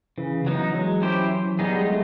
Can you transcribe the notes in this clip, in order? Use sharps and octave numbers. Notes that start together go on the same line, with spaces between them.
C#3 E3
F#3 B3 D#4
F#3 G#3
C#4 E4 G4 C5
E3
G3 B3 D#4 G#4
G#3
G3 A3